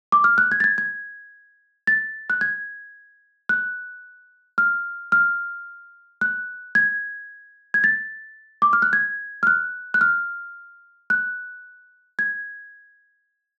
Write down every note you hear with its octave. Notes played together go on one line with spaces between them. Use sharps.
D6
F6
F#6
G#6
A6
G#6
G#6
A6
F#6
G#6
F#6
F6
F6
F#6
G#6
G#6
A6
D6
F6
F#6
G#6
F6
F#6
F#6
F6
F#6
G#6